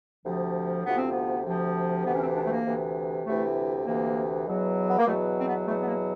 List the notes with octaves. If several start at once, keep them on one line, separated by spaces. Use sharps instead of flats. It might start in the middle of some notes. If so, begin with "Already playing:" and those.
D2 C3 F3
D2 C3 F3 B3
C4
B3
D2 C3 F3
D2 C3 E3 B3
C#4
C4
D4
A3
A#3
D2 C3 E3
D2 C3 E3 A3
D2 C3 E3 A#3
E2 B2 F#3
B3
A#3
E2 B2 F#3 A3
C4
B3
E2 B2 F#3 A3
B3
A#3